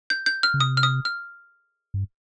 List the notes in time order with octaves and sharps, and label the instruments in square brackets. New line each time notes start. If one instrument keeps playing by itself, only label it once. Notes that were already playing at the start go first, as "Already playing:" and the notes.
[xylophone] G6
G6
F6
[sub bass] C#3
[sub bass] C3 [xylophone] D#6
[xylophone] F6
D#6
F6
[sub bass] G2